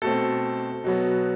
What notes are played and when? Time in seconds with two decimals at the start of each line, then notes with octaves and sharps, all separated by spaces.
0.02 B2 A3 C4 A4
0.84 B2 F#3 B3